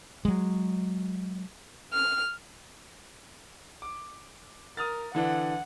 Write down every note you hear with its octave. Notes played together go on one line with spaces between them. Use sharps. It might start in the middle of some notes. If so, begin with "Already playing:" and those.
F#3 G#3
F6
D6
A#4 D#6 F6 A6
D3 E3 D4 F#5